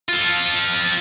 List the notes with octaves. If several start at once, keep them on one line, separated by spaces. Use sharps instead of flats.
F4 A4